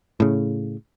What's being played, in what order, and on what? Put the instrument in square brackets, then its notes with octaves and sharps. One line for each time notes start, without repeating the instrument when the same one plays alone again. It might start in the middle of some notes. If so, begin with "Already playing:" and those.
[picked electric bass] A2 C#3